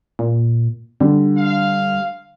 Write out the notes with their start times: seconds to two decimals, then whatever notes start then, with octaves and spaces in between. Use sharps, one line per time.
0.19 A#2
1.00 D3 G3
1.38 F5